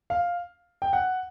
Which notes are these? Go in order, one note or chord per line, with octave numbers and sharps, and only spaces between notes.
F5
G5
F#5